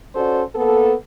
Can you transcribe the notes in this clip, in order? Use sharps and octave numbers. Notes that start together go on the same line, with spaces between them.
C#4 F#4 A4 C5 D5
A#3 B3 A4